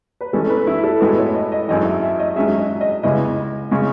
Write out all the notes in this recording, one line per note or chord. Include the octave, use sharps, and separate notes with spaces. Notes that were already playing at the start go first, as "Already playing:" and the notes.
B4
E3 G#3 C#4 A4
B4
E4
A4
A2 G#3 B3 F#4 B4
C#5
D#5
D#5
G#1 F#2 E3 D#5
E5
E5
D#5
G#1 G#2 F#3 C#4 G#4 E5
D#5
D#5
C#2 C#3 G#3 B3 E4 D#5
C#3 G#3 C#4